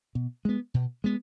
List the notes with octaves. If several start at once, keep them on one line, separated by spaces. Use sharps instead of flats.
B2
G#3 B3
B2
G#3 B3